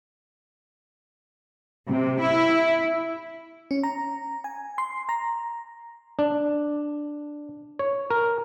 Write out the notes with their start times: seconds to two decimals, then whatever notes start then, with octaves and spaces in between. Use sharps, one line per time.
1.89 C3
2.21 E4
3.71 C#4
3.83 A#5
4.44 G#5
4.78 C6
5.09 A#5
6.19 D4
7.79 C#5
8.11 A#4